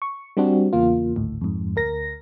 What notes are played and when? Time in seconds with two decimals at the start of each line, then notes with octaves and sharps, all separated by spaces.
0.02 C#6
0.37 G3 C4 D4 F#4
0.73 E2 C#3 A#3 F4
1.16 G#1 D2 A2
1.41 F2 G#2
1.76 D2 A#4 A#6